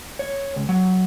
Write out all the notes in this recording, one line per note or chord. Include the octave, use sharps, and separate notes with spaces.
C#5
C#2
F#3